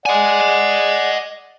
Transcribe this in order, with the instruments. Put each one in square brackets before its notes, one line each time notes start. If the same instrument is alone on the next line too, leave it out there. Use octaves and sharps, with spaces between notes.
[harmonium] D5 F#5 [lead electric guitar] D#5 G#5